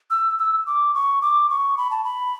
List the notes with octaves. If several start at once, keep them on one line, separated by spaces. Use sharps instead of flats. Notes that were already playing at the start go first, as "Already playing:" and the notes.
E6
E6
D6
C#6
D6
C#6
B5
A5
B5